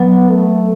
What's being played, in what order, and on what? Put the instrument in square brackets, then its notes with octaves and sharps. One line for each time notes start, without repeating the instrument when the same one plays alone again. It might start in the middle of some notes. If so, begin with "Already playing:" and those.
Already playing: [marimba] F#3 [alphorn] B3
[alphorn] A3